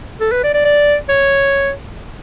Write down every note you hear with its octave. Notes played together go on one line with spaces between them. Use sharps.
A4
B4
D5
D5
D5
C#5